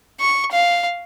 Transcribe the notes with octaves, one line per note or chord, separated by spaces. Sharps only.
C#6
F5